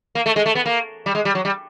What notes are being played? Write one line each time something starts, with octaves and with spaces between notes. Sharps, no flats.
A#3
A3
G#3
A3
B3
A#3
G3
G#3
G3
F#3
G3